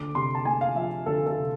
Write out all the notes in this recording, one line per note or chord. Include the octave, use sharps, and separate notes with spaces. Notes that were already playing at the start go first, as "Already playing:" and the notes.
Already playing: D2 D6
C3 C6
A5
A3 G#5
F5
F3 E5
D2 A4
A4
C3